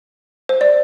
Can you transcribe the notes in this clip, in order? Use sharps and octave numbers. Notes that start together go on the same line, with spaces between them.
C5
D5